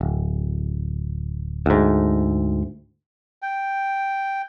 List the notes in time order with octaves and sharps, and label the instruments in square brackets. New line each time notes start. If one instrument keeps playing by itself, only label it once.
[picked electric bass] D1
D2 G#2
[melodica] G5